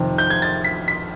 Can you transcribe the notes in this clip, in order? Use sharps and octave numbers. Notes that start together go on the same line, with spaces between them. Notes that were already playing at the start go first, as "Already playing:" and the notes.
Already playing: F2 C3 D#3
G6
G#6
A6
B6
B6